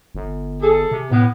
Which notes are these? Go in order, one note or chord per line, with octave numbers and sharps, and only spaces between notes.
G1
G#4 A4
C3
A2 B3